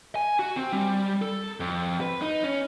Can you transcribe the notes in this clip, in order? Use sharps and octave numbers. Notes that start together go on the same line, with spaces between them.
G#5
F#4
C4
G3
A4
F2
B4
D#4
C#4